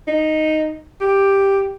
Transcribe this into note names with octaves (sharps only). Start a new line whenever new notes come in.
D#4
G4